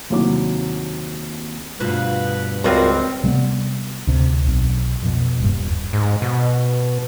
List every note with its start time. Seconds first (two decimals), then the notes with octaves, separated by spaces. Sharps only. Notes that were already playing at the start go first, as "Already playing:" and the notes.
0.10 D#2 C3 D#3 F#3 E4 D6
1.80 D2 G2 B2 F4 B4
2.64 C#2 G3 C4 F4 F#4 A#4 D5
3.23 C3 G3 G#3 B3
4.07 D2 C3
4.47 B1
5.02 F2 B2
5.40 D#1 G2
5.93 G#2
6.22 B2